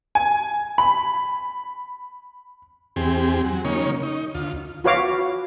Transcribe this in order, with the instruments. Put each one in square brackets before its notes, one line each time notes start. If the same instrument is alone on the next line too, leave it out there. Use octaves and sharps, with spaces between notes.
[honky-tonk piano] G#5
B5
[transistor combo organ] E2 C4 G4 G#4
F#3
C#3 A#3 D#4 C#5
D#4
D2 F4
[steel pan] F4 F#4 B4 C#5 F5 D6